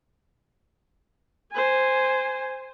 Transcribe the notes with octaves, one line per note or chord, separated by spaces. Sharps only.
C5 G#5